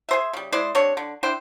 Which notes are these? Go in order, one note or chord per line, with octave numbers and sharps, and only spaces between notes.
G#4 C5 E5
C#3 G3
G#3 E4 C5 D5
G3 C4 D4 C#5
D3
D4 E4 C5 G5